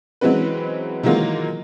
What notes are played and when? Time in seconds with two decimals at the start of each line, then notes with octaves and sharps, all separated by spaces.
0.21 E3 F#3 G#3 C4 C#4 B4
1.03 D#3 E3 F#3 G#3 A#3 F4